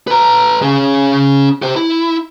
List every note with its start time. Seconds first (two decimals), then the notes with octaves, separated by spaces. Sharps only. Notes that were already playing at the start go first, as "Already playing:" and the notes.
0.07 B4 A#5
0.62 C#4 G#4
1.62 G4 C5
1.76 E4